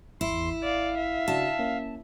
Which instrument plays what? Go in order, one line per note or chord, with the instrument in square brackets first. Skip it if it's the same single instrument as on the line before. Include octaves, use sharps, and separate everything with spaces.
[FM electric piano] G#1 [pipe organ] E2 C6 [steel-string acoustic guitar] E4
[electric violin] D5 [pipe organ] F5
[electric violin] E5
[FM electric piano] C#3 D4 F#4 [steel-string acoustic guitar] A5
[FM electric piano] A#3 C#4